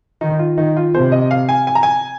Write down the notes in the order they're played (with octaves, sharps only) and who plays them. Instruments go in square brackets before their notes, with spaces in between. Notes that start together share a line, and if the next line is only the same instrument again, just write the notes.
[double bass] D#3 [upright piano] D#4
[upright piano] F4
[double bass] D#3 [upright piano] D#4
[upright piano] F4
[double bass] C3 [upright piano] C5
[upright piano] D#5
F5
G#5
G#5
A#5
G#5